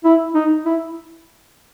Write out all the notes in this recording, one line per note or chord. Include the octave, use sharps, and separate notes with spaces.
E4
D#4
E4